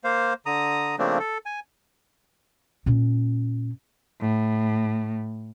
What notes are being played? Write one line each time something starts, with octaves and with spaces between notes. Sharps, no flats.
A#3 C5 F5
D3 A#5 D#6
C#3 F3 A3 A#3 C4 D4
A4
G#5
A#2 C#4
A2